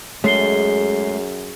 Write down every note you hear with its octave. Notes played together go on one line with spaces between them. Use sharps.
F#2 G#3 A3 G#4 C#5 C7 G7